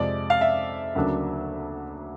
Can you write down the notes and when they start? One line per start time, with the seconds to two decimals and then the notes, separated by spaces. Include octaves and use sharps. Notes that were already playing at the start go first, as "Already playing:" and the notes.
Already playing: F2 C3 F3 G#3 D5
0.30 F5
0.41 E5
0.95 D2 C#3 F#3 A#3 D4